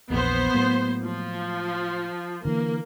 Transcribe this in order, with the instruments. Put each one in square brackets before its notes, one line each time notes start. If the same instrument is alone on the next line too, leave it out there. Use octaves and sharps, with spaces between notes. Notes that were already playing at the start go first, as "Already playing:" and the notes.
[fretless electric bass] A#1 E2 [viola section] B3 C5
[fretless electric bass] A2 F#3 A#3
[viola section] F3
[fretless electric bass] D3 E3 [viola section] A#3